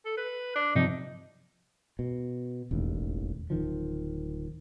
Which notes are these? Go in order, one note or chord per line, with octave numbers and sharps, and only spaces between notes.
A4
B4
D4
C3 F3 D#4
B2
E1 A1 D#2
D1 D#3 F3